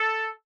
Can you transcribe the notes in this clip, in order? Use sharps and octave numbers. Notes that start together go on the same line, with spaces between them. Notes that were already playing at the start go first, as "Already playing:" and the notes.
Already playing: A4